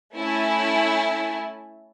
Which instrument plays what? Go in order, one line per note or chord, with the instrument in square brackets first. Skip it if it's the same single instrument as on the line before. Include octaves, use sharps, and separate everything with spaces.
[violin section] A3 C#4 E4 E5 G#5 A5